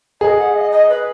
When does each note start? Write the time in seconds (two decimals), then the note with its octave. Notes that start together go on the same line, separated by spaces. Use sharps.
0.21 G#4 D#5
0.38 F#5
0.54 D#5
0.71 D#5
0.89 B4